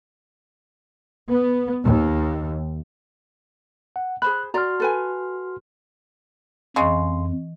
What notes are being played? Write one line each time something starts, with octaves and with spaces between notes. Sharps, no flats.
B3
D#2
F#5
G#4 C5 B5 F#6
F#4 D5 A#5 C6 F6
A4 B4 G#5
F2 C#3 E3 G#3 D#5 C#6